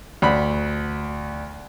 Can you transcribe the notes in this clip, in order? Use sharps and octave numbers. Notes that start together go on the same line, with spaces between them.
D2 B5